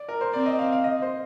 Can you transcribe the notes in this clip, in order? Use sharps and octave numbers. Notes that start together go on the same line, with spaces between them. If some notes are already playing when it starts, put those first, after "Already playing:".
Already playing: D5
A#4
C5
C4 D5
D#5
F5
F5
D#5
C5